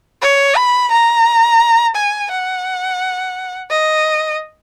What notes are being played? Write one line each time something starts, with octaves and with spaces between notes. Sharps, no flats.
C#5
B5
A#5
G#5
F#5
D#5